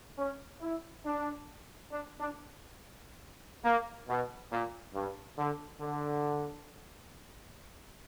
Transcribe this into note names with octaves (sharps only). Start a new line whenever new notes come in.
C#4
E4
D4
D4
D4
A#3
B2
A#2
G2
D3
D3